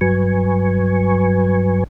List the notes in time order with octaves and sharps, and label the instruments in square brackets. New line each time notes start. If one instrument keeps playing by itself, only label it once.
[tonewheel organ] G2 F#3 B4 G#5 C#6